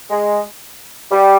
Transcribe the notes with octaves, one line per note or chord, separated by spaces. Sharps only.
G#3
G3